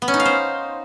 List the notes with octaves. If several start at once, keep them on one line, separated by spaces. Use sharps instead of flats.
B3
C#4
D#4
F5
C5